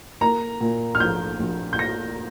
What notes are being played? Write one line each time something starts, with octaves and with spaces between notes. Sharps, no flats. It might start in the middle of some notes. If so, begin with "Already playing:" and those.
A#3 A#5
A#2
F6
A#1 G6
A#1
G6
A#3 A#6